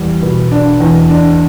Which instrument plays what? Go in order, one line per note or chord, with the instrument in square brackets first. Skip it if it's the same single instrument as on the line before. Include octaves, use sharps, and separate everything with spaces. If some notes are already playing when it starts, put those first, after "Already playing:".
Already playing: [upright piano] E2 G3
B2
D4
E2
D4